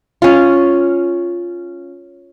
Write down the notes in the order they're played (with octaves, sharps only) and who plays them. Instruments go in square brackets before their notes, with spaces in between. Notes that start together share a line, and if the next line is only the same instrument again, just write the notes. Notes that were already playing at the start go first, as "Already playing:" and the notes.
[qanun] C#4 F4